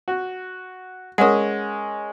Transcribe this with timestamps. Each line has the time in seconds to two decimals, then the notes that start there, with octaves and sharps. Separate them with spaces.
0.08 F#4
1.18 G#3 C#4 A#4 F#5 D#6